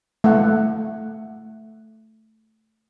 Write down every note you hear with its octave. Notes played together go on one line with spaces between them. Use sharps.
A3 F#5